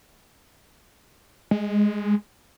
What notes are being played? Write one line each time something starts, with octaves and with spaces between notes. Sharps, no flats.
G#3